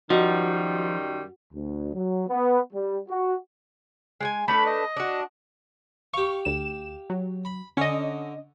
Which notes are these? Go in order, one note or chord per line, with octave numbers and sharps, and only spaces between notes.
F#2 D#3 F3 G3 D#4 F#4
D2
F#3
B3
G3
F#4
G#3 G5 G#5
A3 D4 B4 B5
D#5
D4 F#4
G4 F5 C#6
D2 E7
F#3
B5
D3 C#4 D#5 C#6